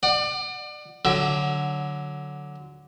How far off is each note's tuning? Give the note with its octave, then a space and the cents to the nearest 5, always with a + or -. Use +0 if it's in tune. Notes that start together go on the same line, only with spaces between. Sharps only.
D5 +30 F#5 +0
D3 +0 F#3 +0 E5 +0